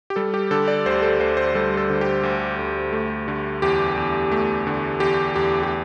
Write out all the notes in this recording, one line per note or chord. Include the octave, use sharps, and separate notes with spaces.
G4
G3 A4
G4
D3 A4
D5
D2 C5
A4
D2 C5
C5
G3 A4
A4
D3
G4
D2
D2
A3
D3
E2 G4
E2
A3
D3
E2 G4
E2 G4
G4